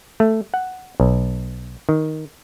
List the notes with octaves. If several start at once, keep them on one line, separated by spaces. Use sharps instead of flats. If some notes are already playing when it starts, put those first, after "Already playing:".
A3
F#5
B1
D#3